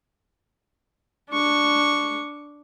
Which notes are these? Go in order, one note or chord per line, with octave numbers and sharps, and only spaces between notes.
D4 C#6